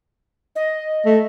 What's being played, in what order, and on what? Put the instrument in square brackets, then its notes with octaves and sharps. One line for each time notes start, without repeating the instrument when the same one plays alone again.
[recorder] D#5
[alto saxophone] A3